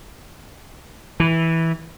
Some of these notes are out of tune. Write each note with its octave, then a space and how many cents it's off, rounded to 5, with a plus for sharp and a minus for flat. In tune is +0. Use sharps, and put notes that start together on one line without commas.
E3 -10